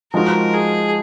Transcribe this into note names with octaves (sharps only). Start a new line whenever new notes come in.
F3 G#3 D#4 F#4 A#4
G#4